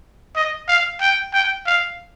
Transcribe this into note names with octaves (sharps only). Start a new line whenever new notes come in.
D#5
F5
G5
G5
F5